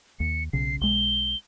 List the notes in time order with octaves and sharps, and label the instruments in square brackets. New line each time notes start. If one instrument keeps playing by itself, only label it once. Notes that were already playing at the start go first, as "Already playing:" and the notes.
[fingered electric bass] D#2 [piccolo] C#7
[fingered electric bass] B1 C#3 [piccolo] C7
[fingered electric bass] B1 G#3 [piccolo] G7